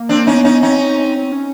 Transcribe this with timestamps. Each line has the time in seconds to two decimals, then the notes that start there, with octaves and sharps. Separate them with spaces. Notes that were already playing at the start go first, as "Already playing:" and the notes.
Already playing: A#3
0.09 C4 D4
0.27 B3 C#4 D#4
0.44 C#4 D#4
0.63 C4 C#4 D#4
1.32 C#4